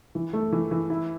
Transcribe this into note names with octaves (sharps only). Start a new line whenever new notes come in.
E3
A3
E3
E3
E4